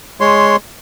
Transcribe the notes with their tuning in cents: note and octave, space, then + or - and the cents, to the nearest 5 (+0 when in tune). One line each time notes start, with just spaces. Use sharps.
G#3 +0 C#5 +0 C6 +0